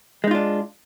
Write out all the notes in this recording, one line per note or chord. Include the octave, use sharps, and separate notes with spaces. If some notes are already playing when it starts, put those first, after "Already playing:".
G#3 D4 D#4 F4